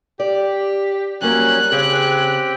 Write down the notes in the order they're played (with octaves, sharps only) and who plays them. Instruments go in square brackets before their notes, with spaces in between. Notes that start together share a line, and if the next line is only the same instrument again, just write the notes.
[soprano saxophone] G4 [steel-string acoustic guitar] D5
[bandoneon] F#3 C#4 [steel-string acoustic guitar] G3 A#3 [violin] F#6
[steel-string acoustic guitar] C#3 [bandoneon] C4 G4 G5 [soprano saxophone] G#4